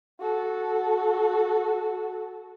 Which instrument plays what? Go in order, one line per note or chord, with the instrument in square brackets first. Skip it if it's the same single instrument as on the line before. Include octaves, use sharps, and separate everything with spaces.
[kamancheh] F#4 A4